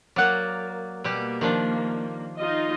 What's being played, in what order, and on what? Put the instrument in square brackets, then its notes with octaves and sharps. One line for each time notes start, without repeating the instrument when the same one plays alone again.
[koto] F#3 A#3 [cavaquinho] D5 F#5
[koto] B2 G3 G4 [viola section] A#3
[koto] D#3 F3 D4
[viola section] D#4 F4 D#5